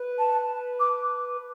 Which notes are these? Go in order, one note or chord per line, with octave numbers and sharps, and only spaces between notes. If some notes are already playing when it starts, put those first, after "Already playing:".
Already playing: B4
A5
D6